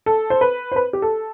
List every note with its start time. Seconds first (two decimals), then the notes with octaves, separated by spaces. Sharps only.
0.06 A4
0.30 C5
0.41 B4
0.72 C5
0.76 B4
0.93 G4
1.02 A4